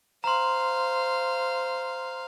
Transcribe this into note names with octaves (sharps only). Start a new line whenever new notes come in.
C5 F5 A#5 C6